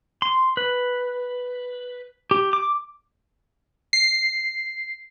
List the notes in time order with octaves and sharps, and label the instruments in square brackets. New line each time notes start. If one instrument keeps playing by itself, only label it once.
[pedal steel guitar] C6
B4
G4
D6
[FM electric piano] C7